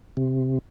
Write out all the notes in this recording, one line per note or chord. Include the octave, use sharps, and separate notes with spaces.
C3